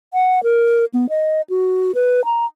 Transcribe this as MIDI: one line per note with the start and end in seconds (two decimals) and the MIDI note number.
0.14 0.42 78
0.43 0.85 70
0.94 1.06 59
1.09 1.41 75
1.49 1.92 66
1.95 2.24 71
2.25 2.45 82